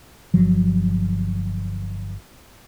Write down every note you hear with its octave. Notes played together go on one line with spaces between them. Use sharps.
G1 F3 F#3